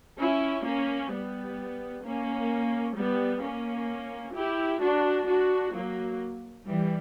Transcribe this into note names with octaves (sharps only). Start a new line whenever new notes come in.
C#4 E4
A#3 C#4
G3 B3
A#3 C#4
G3 B3
A#3 C#4
E4 G4
D4 F#4
D4 F#4
F#3 A#3
E3 G3